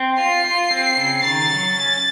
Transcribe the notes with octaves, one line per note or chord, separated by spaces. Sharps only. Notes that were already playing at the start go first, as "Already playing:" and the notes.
Already playing: C4
F4 C7
F4
C4
C#3
D#3 A6
F#3
C#4